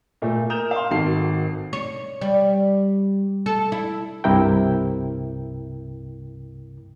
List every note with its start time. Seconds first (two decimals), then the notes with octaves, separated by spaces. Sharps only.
0.22 A#2 A3
0.50 A#4 D#6 G6 E7 F7
0.71 F5 C6
0.91 G#1 D#3 F#4 A4 C7
1.73 C#5
2.21 G3
3.46 A4
3.72 E4
4.24 C2 G2 C3 E4 A#4 G5